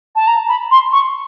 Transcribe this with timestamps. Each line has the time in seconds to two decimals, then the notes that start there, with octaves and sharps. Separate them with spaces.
0.15 A5
0.27 A#5
0.48 B5
0.71 C6
0.92 C#6